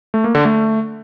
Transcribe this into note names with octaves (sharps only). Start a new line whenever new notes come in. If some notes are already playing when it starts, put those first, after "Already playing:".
A3
A#3
D3
A3